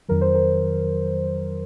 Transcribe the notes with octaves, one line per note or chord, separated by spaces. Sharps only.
F2 D#3 F#3 A#4
C5
A#4